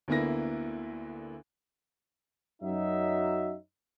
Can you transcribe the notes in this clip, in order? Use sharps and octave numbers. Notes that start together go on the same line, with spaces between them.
D2 D3 A#3 B3 E4 A#6
F#2 F#3 D#4 E5